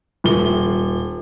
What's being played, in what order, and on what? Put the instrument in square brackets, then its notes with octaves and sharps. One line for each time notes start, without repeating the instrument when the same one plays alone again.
[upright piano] D#1 G7